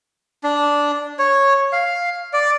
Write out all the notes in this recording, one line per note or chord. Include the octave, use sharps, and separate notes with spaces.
D4
C#5
F5
D5